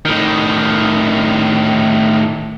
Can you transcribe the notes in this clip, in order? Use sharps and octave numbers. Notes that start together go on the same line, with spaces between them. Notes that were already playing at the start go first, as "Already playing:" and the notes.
A2 D#3